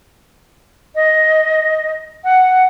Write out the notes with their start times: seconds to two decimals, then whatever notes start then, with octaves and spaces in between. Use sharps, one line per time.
0.95 D#5
2.24 F#5